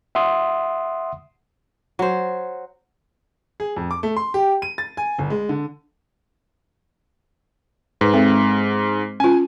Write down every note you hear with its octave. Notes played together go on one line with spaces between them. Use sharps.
E5 F#5 C6 D#6
F#3 C5
G#4
F2
D6
A3
C6
G4
D#7
A6
G#5
G1
G#3
D3
G#2 B4
G#3 C4 A4
C#4 F4 G#5